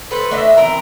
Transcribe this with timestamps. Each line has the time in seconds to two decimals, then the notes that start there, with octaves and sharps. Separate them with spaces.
0.11 A4 B4 C5
0.31 A3 D4 D#5 E5
0.57 E3 C4 A#4 A#5